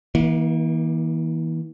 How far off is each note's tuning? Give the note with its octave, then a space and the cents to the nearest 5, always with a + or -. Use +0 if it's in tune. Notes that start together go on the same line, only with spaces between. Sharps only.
E3 -35 A#3 +30